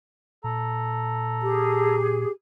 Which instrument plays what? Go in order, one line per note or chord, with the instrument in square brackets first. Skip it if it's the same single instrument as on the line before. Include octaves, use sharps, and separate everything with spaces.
[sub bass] A#2 [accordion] A4 A#5
[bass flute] G4 [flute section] G#4